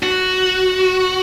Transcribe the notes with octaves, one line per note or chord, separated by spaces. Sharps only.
F#4